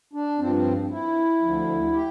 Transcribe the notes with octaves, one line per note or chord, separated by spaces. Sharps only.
D4
G2 F3 C4
C4
E4
D2 D3 F3
G4